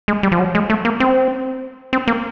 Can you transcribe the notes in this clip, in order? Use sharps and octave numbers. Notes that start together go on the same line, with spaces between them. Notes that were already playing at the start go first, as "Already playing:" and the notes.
G#3
G3
F3
F#3
G#3
A3
A#3
C4
C4
A#3